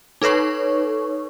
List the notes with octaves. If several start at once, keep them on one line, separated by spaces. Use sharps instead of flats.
D#4 A4 B4 C#5 C#6